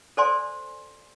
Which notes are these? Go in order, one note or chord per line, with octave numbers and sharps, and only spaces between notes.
A4 C5 D5 G#5 C6